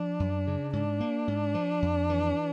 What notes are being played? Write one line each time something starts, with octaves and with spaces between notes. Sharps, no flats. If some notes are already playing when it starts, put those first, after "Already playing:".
Already playing: F3 D4
F#2
C#3
G#2 D4
A#3
G#2
F3
F2
E3